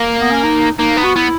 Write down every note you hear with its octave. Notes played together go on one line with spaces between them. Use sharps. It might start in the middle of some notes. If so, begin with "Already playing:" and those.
Already playing: A#3
B3
C#4
D#4
A#3 D#4
B3
F#4
B3 E4